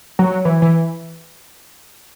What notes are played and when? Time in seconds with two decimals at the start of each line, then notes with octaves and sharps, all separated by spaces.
0.19 F#3
0.45 E3
0.62 E3